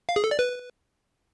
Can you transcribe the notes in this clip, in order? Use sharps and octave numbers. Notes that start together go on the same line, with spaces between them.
F5
G#4
A4
D5
B4